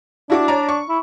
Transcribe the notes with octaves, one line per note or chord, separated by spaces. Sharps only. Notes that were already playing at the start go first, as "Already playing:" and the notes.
D4 E4 F#4 D6
C#5 D5 A#5
C#6
E4